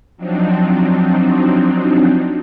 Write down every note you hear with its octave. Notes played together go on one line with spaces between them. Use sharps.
F3 F#3 C4 D4 D#4